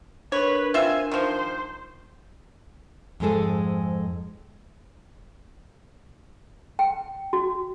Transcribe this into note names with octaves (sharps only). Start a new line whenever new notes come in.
D4 A#4 B4 C#5
C4 F4 E5 G#5
D#3 F3 C5
F2 G#2 G#3 G#4 A4
G5
F#4